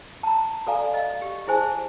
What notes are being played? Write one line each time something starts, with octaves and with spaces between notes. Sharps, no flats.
A5 A#5
F#4 A4 D5 F5 G#5 A#5
D#5 F5
G4
E4 G#4 C5 G#5 A5